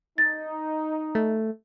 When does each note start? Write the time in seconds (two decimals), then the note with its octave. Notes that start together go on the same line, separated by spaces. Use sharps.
0.18 D#4 A6
1.15 A3